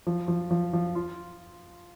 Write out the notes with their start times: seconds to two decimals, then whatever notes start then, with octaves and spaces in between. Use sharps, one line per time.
0.07 F3
0.28 F3
0.51 F3
0.73 F3
0.95 F4